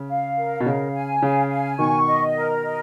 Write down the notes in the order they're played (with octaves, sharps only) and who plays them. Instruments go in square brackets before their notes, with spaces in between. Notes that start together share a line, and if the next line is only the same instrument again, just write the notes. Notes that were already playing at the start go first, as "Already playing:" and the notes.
Already playing: [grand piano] C#3
[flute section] F5
A#4
[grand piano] B2
[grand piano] C#3 [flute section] F5
[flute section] G#5
[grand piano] C#3 [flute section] F5
[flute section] G#5
[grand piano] B2 D#3 [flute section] C#6
[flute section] D#5
A#4
D#5